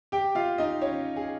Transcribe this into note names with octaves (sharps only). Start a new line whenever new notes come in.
G4 G5
F4 F5
D#4 D#5
C#4 C#5
G#4